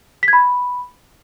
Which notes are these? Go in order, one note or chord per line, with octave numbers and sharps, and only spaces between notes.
B6
G#6
B5